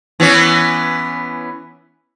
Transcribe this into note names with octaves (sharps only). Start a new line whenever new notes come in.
E3 B3 C#4